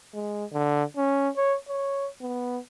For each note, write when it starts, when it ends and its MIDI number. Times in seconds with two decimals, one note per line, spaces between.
0.14 0.45 56
0.53 0.84 50
0.97 1.30 61
1.37 1.56 73
1.69 2.08 73
2.21 2.59 59